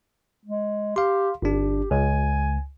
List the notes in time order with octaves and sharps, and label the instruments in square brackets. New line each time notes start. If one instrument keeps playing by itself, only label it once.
[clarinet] G#3
[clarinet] G4 [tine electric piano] F5 C6
[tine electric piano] G1 D4 [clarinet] G4
[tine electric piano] C#2 [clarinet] G#5